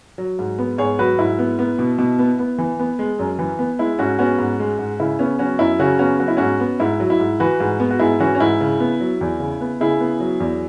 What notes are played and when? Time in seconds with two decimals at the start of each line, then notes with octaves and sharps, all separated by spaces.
0.18 F#3
0.39 G#2
0.58 B3
0.78 G#2 G#4 C#5
0.99 F#3 F#4 B4
1.19 G#2 E4
1.39 B3
1.59 B3
1.79 B2
1.98 B2
2.19 B3
2.39 B3
2.58 E3
2.80 B3
2.99 G#3
3.19 F#2
3.39 E3
3.59 B3
3.79 G#3 E4
3.99 G#2 C#4 F#4
4.19 B3 C#4 F#4
4.39 G#2
4.60 G#3
4.79 G#2
5.00 C#3 E4
5.19 B3 C#4
5.39 F#3 C#4 F#4
5.59 F#2 E4
5.79 C#3 C#4 F#4
5.99 B3 C#4 F#4
6.20 F#3 F#4
6.28 E4
6.37 G#2 C#4 F#4
6.60 B3
6.80 G#2 E4
7.00 F#3
7.10 E4
7.20 G#2
7.40 E3 F#4 B4
7.60 G#2
7.80 B3
7.91 F#4
8.00 G#2 E4 G#4
8.20 E3 C#4 F#4
8.35 C#4
8.40 G#2 E4
8.61 C#3
8.80 B3
9.00 F#3
9.21 E2
9.40 C#3
9.61 B3
9.80 C#3 E4 G#4
10.00 B3
10.20 F#3
10.40 E2